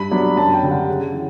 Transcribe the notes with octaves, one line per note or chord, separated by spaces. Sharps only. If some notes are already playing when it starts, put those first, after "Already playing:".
Already playing: G2 B5
F#3 B3 D4
F#2 A5
G5
D3 G3
F#5
C#3
E3